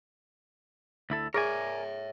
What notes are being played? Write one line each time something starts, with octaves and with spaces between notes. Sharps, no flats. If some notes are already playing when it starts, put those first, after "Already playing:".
D2 E4 A4
G#4 A#4 C#5 D5 E5 G#5